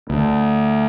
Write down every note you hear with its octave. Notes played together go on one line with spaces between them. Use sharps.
D2